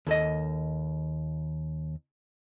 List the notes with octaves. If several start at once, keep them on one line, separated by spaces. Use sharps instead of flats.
D#2 A4 D#5